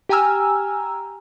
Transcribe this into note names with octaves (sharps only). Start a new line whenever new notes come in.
G4 G5 G#5 A#5 E6 F6